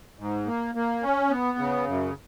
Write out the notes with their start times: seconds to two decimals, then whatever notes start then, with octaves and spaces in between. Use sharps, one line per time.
0.19 G#2
0.47 A#3
0.75 A#3
1.03 C#4
1.30 B3
1.58 C#3
1.87 F#2